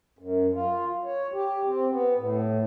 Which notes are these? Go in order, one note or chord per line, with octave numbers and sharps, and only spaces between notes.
F#2
F4
C#5
G4
C4
B3
A2